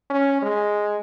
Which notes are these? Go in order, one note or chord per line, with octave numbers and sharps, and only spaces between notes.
C#4
G#3